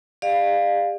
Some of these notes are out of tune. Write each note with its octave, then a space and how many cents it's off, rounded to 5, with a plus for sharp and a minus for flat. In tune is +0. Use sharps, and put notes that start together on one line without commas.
G#4 -45 D5 +35 F5 +0